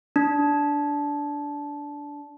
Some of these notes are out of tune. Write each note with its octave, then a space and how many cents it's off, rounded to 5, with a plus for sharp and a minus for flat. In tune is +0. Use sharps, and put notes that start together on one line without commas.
D4 -15